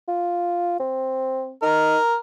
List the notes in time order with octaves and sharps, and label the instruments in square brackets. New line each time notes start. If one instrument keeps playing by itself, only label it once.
[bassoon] F4
C4
[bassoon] D#4 [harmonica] A#4